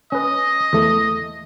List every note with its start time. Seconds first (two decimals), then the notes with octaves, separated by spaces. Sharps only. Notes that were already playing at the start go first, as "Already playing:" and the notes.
0.12 C#4 B4 D#5
0.73 E2 A3